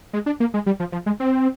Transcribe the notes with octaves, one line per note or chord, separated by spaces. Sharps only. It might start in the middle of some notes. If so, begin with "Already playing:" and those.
G#3
D4
A#3
G#3
G3
F3
F3
G#3
C4